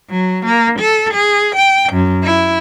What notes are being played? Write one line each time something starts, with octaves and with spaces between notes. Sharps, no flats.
F#3
A#3
A4
G#4
G5
F#2
E4